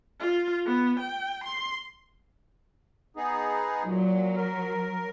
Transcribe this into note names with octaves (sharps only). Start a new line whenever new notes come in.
F4
B3
G5
C6
B3 D#4 G#4
A#2 F#3
A#4